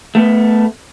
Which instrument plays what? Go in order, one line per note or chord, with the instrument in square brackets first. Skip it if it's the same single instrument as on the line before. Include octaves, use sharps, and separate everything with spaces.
[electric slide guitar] A3 B3